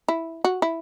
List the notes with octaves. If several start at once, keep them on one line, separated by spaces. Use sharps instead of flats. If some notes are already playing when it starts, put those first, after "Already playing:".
E4
F#4
E4